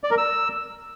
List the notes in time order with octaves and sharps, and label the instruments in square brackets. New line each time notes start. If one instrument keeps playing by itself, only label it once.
[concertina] D5
A#4
E6